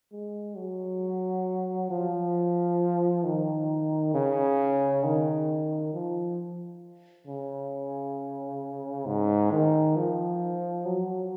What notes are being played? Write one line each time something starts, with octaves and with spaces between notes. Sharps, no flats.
G#3
F#3
F3
D#3
C#3
D#3
F3
C#3
G#2
D#3
F3
F#3